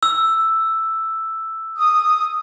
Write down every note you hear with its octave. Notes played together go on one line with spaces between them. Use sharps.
E6
D#6